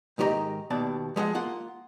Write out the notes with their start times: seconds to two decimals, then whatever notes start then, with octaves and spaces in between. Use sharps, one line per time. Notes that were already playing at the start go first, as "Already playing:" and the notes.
0.18 G#2 D#3 G4 C#5 D#5 A#5
0.70 D#2 B2 D5 A5
1.16 F3 G#3 E5 F#5
1.34 A#3 F4 F#5